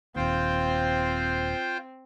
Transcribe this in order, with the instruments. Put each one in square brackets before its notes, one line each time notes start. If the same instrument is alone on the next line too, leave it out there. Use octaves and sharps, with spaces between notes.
[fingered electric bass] D#1 D#2 [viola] C4 [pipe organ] F4 C5 G5